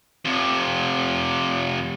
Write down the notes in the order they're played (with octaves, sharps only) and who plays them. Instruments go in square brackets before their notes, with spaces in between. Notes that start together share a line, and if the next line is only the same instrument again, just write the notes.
[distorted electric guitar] F2 C3